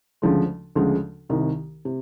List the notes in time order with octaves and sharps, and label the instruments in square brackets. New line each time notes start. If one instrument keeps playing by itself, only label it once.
[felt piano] D2 C#3 F3 G#3
D2 C#3 F3 G#3
C2 C3 D#3
C3